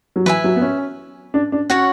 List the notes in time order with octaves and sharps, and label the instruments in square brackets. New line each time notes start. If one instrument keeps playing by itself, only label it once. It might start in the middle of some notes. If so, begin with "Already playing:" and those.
[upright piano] F#3
[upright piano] E3 [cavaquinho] B4 E5 G#5
[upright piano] F#3
B3
C#4
D4
D4
[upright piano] C#4 [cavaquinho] F#4 C#5 F#5